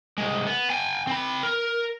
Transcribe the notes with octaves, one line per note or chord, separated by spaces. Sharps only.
C2 G#3
B3
G5 G#5
C4 B5
A#4